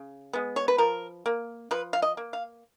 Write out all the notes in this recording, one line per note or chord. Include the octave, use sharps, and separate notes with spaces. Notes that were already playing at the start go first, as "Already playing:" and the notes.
Already playing: C#3
G#3 B3
C#5
B4
F3 A#4
A#3
F3 B4
F5
D#5
A#3
F5